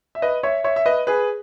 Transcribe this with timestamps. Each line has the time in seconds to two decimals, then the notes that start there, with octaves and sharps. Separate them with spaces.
0.15 E5
0.22 B4 D#5
0.43 C#5 E5
0.64 C#5 E5
0.76 E5
0.86 B4 D#5
1.07 G#4 B4